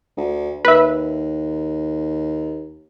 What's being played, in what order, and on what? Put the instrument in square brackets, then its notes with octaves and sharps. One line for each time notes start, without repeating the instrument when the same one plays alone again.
[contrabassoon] D2
[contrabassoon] D#2 [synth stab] B4 E5